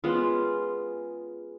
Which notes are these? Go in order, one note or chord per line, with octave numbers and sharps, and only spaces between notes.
G#3 B3 C#4 F4